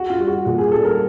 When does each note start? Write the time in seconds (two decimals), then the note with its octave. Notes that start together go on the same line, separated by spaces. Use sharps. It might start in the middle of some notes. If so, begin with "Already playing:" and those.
Already playing: F#4
0.10 F4
0.19 G3
0.27 F#4
0.45 A#2 F#4
0.58 G#4
0.72 G3 A4
0.85 A#4